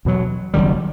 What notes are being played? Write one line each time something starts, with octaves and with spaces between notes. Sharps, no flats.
E2 B2 F#3
F#1 F#2 D#3 G3